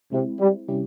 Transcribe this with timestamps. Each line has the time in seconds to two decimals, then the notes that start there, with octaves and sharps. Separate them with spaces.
0.12 C3 G#3 C4 E4
0.40 G3
0.68 C3 G3 C#4 E4 G4